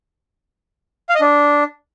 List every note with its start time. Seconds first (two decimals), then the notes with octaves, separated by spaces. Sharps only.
1.09 F5
1.15 D#5
1.21 D4